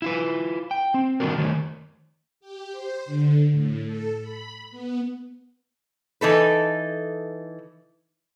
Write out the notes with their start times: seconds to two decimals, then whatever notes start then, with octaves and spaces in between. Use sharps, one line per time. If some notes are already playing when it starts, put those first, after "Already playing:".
0.02 E4 F4 B4
0.71 G5
0.94 C4
1.20 D#3 G3 A3 D4 F#4 A#4
1.38 D#3 A3 C#5
2.40 G4
2.72 C5
3.06 D3
3.52 A2
3.86 A4
4.21 B5
4.71 B3
6.21 E3 D#4 A4 B4